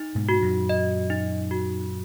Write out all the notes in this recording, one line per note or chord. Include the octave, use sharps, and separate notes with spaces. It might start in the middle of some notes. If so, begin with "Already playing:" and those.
Already playing: D#4
G#2 B2
F#4
F#2 A#2
D#5
D#4
F#4